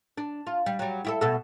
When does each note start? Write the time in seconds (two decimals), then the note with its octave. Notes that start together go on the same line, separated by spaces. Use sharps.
0.18 D4
0.47 F4
0.66 G3
0.79 F#3 G3
1.05 E4 G4 A4
1.21 B2 A4